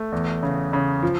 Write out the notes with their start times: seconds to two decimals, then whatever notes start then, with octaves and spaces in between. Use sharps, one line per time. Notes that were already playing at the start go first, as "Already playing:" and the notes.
Already playing: A3
0.12 E2
0.43 C#3
0.73 C#3
1.03 F3